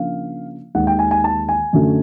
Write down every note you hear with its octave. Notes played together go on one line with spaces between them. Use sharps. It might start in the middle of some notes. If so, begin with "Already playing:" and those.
Already playing: C#3 F3 A#3 D4 F5
D#2 D#3 G#3 F#5
G5
G#5
G#5
A5
G#5
F#2 D3 F#3 A3